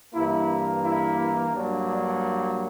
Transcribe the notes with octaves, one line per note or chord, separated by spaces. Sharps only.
G2 E3 A#3 E4
E4
G2 F#3 A#3 D4
D4